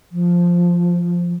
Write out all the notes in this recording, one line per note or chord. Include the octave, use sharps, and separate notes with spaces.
F3